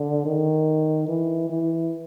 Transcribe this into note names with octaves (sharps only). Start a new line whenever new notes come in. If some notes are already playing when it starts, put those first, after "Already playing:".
Already playing: D3
D#3
E3
E3